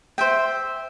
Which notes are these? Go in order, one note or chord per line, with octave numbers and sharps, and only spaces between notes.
C5 E5 G5